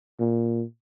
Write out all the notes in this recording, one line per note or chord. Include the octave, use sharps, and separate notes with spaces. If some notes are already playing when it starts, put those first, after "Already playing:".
A#2